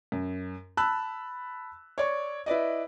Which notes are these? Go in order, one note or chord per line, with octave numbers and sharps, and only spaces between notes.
F#2
A5 B5 E6 F#6
C#5 D5 C#6
E4 B4 D5 D#5